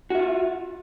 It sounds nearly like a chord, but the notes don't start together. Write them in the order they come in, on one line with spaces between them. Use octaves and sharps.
F#4 E5 F4